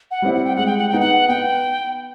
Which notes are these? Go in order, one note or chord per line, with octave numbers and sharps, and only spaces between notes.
F#5
G3 C4 E4
F#5
G5
G#3 F#5
G5
F#5
B3 D#4 G5
F#5
B3 G5